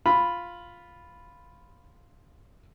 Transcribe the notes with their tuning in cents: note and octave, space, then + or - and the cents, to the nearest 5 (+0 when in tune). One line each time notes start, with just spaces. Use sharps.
F4 +0 B5 +0